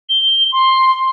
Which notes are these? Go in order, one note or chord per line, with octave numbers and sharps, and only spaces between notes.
G7
C6